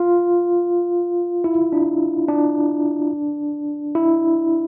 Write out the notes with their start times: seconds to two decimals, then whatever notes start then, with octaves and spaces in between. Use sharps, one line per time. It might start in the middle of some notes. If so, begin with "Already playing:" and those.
Already playing: F4
1.44 E4
1.73 D4
2.28 D4
3.95 E4